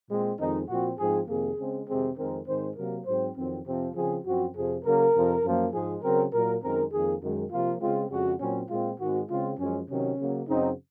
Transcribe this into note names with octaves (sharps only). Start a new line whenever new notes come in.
A#2 G#3 C4
F2 D#3 G#3 C4 D#4
A#2 F3 C4 F#4
G#2 F3 C4 G#4
F2 C3 D#3 A#3 G#4
C#3 G#3 C4
F2 C3 D#3 G#3 C4 G#4
F2 D#3 G#3 C4 A#4
G#2 D#3 G#3 C4 C5
C3 F#3 A#3 A#4
G#2 F#3 C4 C5
F2 D#3 F#3 C4
F2 C3 F3 C4
C#3 F3 C4 G#4
F#2 F3 C4 F#4
F2 C3 F3 G#4
C#3 F#3 A#3 A#4
F2 C3 F3
F#2 F3 A#3
G#2 F3 G#3 G#4
C#3 F#3 C4 A#4
A#2 F#3 A#3 A#4
F#2 D#3 G#3 C4 A#4
F2 D#3 A#3 G#4
F#2 D#3 G#3
C3 F3 A#3 F4
C#3 G#3 C4 F4
F2 C#3 G#3 F#4
A#2 F#3 C4 C#4
A#2 G#3 C4 F4
G#2 D#3 G#3 C4 F#4
C#3 G#3 C4 F4
F#2 F3 G#3 C#4
C3 D#3 F#3 C#4
C#3 F#3 A#3
F#2 C#3 F#3 C4 D#4